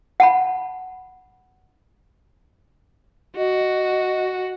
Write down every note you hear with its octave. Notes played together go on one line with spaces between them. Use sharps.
F#5 A5 B5
F#4 D#5